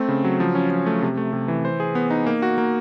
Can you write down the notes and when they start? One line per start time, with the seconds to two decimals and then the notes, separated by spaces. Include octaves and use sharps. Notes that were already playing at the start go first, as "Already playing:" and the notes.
Already playing: A3 C4
0.09 C#3
0.24 F#3
0.40 F3
0.55 C#4
0.71 F3
0.86 A3
1.02 C3
1.17 A3
1.33 C3
1.48 E3
1.65 C5
1.80 G#4
1.95 B3
2.10 D#4
2.26 A#3
2.42 F#4
2.58 A#3